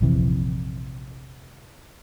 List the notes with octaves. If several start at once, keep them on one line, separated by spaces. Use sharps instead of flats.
A#1 F2 C3 E3